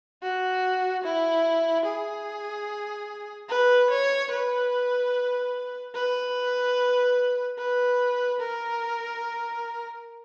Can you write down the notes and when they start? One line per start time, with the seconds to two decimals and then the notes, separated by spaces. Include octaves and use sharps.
0.22 F#4
1.04 E4
1.85 G#4
3.49 B4
3.90 C#5
4.31 B4
5.94 B4
7.58 B4
8.40 A#4